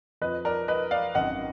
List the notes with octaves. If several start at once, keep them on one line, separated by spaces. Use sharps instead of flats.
F2 F3 B4 D#5
A#4 D5
B4 D#5
D5 F5
G#1 F#2 D#3 D#5 F#5